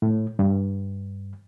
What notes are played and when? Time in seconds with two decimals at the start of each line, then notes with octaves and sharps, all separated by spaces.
0.02 A2
0.39 G2